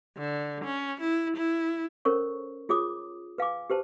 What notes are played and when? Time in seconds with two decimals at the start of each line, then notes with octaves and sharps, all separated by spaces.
0.18 D3
0.64 C#4
1.01 E4
1.37 E4
2.05 C#4 A4 A#4 C5 C#5 C#6
2.69 F4 G#4 C#5 D6 D#6
3.38 B4 F5 G#5 D6
3.70 G4 B4 C5 A5